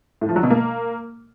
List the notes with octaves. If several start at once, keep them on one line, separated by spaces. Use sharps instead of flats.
A2
F3
F#3
B2
A#3